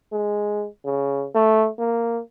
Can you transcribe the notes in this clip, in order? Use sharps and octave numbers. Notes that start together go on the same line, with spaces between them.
G#3
C#3
A3
A#3